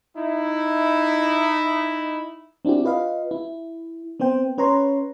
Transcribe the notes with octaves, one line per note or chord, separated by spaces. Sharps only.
D#4 E4
C4 D4 E4 F#4 G4
F4 B4 D#5 F5
E4
B3 C4 C5 G5
C#4 B4 C#5 A#5 C6